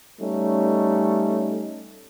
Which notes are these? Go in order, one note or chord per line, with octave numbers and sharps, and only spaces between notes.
G3 A3 C#4 D#4